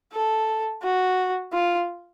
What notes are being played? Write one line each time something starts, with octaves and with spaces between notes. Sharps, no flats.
A4
F#4
F4